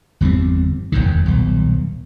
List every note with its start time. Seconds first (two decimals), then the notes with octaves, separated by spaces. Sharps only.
0.21 G1 E2 G3 C4
0.92 E1 B1 F#2 D#3
1.26 D#1 B1